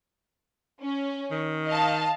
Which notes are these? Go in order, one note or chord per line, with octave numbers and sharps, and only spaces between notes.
C#4
D#3
D#5 F5 A5